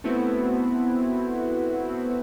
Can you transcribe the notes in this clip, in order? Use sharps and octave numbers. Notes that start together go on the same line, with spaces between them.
A3 B3 C4 E4 F#4